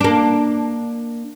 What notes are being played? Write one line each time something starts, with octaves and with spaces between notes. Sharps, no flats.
A#3 D4